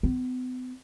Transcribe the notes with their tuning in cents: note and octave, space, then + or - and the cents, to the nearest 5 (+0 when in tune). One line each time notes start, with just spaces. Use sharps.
B3 +40